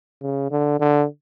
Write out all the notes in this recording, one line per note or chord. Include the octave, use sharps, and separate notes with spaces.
C#3
D3
D3